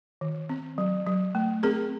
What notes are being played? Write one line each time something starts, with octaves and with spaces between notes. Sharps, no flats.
D#3
C4
F#3
F#3
A3
C4 G#4 A#4